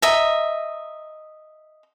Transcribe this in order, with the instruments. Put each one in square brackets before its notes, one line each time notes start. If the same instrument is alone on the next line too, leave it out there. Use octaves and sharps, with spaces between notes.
[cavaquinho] D#5 E5 A#5